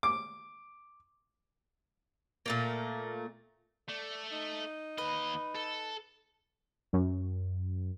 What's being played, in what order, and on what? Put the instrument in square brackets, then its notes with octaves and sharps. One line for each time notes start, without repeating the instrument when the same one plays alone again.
[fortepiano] D6
[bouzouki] A#2 A3 A#3
[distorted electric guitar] A3 [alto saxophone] D5
[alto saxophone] D#4
[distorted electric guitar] D#2 D#5 [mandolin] B4
[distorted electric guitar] A4
[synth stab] F#2